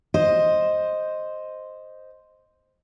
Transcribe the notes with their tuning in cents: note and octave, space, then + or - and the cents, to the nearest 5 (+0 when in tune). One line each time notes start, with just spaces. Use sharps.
C5 +0 D#5 +0